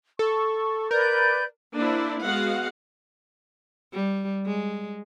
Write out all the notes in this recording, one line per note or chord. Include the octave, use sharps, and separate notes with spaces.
A4 C#6
A#4 B4 D5 G6
A#3 D4 E4 C5
G#3 B3 F#4 F5 F#5
G3
G#3